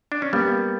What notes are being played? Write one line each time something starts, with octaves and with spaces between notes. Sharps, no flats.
D4
C#4
G3 A#3 B3